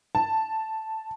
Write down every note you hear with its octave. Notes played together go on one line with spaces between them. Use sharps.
A5